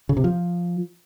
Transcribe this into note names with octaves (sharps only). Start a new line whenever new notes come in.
C#3
C3
F3